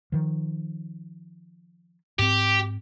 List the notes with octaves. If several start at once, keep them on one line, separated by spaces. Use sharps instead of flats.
D#3 F3
G#2 C4 G4